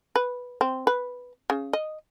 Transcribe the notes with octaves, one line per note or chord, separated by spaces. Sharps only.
B4
C4
B4
C#3
D#5